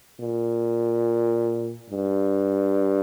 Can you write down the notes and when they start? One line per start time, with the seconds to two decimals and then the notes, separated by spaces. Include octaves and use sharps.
0.20 A#2
1.90 G2